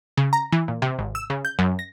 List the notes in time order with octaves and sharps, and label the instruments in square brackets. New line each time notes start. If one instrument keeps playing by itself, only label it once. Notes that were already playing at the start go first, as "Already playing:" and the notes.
[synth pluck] C#3
A#5
E3
A#2
C3
G#1
E6
C#3
G6
F#2
A#6